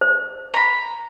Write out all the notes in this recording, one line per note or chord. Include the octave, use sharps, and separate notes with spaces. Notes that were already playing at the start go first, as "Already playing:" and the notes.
C5
A#5 B5